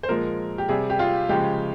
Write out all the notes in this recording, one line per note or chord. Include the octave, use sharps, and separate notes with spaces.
C5
A#2 F3 G#3 A#4
G4
C3 G3 G#4
G4
F4
C#3 F3 G#3 G4